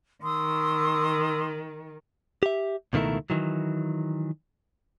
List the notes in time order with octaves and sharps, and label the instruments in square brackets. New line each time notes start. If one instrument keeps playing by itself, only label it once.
[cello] D#3 [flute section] C6 D#6 E6
[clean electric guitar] G4 E5
C#2 B2 D#3 A3 E4 A#4
D#3 E3 F#3